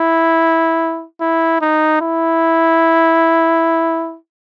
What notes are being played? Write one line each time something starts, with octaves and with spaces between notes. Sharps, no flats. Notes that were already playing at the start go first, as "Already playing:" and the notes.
Already playing: E4
E4
D#4
E4